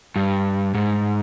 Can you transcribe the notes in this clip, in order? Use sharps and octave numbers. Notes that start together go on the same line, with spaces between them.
G2
G#2